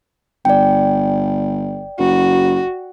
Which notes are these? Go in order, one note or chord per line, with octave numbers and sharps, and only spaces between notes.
G1 D5 G5
F#1 F#4